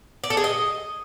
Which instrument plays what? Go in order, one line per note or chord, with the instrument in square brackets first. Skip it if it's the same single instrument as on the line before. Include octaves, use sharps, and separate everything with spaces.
[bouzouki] D5
A4
G#4
D#5